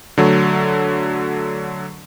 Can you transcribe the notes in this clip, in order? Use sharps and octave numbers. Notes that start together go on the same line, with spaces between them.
D3 F#3 A3